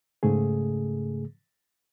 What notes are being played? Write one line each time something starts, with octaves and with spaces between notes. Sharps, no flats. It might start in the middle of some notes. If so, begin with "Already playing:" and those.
G#2 C#3 A3 G#4